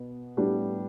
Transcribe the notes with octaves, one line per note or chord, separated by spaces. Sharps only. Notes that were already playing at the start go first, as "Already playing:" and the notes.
Already playing: B2 B3
A2 G3 B3 D4 G4